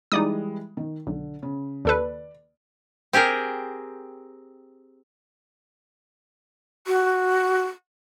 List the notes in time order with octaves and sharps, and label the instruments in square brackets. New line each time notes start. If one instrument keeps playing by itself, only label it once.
[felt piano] E3 G3 G#3 [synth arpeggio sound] D#4 D5 D#6
[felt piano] D#3
[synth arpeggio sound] B1 [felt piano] D3
[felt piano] C#3
[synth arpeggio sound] D#2 A4 B4 [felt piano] D5
[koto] C4 G4 G#4 A#4
[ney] F#4